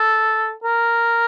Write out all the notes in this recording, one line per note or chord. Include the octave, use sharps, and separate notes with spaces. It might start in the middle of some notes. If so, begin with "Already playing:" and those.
Already playing: A4
A#4